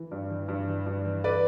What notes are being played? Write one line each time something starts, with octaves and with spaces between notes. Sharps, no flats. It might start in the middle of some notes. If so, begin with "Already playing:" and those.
Already playing: E3
G2
E3
G2
E3
G2
E3
B4 D5